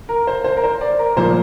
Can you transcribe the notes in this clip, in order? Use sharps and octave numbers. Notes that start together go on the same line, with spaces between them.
A#4
C5
C5
A#4
C5
D5
A#4
A#2 F3 A#3 C5